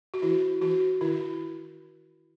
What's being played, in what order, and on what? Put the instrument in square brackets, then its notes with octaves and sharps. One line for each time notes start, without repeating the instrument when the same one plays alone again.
[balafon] F#4
E3 E4
E3 F#4
D#3 E4